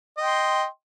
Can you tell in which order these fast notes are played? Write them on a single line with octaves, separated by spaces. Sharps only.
D#5 G5 C6